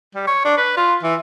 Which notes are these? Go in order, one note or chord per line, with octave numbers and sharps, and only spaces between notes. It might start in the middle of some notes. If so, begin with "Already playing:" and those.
G3
C#5
D4
B4
F4
E3